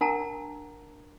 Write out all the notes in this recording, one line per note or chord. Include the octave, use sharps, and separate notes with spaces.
D4 A#4 F#5 A5 A#5